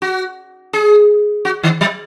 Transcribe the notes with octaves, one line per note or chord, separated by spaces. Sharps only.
F#4
G#4
F#4
D#3
F#3